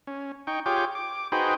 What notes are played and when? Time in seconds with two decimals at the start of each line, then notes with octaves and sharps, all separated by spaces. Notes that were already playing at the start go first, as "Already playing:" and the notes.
0.07 C#4
0.47 D#4 G5 C#6
0.66 F4 G4 G#4 C#5 G5 D6
0.95 D6
1.32 D#4 F#4 G#4 B4 C5 G5